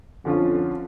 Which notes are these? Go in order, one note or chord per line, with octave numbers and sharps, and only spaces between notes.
F2 D3 F3 C#4 F4